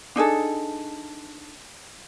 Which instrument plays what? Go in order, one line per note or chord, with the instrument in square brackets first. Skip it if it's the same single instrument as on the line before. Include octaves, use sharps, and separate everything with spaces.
[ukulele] D4 D#4 G#4 A4